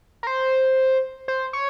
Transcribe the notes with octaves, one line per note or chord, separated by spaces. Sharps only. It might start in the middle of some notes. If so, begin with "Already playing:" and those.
A#4
C5
C5
C#5